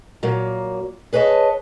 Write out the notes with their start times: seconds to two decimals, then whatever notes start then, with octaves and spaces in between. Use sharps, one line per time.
0.23 A#2 F#3 A#3
1.13 G#4 B4 C#5 D#5 A5